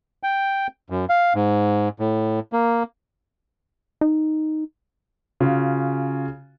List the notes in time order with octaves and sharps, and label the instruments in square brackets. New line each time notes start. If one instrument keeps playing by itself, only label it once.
[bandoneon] G5
F#2
F5
G#2
A2
A#3
[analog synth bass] D#4
[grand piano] C#3 C#4 F4 F#4